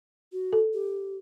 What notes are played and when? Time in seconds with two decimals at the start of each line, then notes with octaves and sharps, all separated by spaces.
0.32 F#4
0.53 A4
0.74 G4